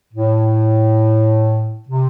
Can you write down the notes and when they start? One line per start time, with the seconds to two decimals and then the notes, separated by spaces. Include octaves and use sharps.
0.13 A2
1.88 C3